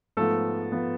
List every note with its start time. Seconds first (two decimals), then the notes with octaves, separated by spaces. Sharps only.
0.17 G#2 F3 A3 B3 A4
0.72 F3 B3